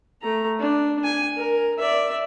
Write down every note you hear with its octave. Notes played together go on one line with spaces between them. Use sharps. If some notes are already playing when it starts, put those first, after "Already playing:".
A3 A#5
D4
G#5
A#4
D5 E5